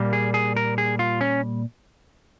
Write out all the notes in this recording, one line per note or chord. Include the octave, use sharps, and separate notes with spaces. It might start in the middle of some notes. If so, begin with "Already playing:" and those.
Already playing: A#2 G3 A#3
G#4
G#4
A#4
G#4
F4
C#4